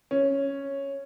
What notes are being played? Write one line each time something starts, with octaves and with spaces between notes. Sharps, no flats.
C#4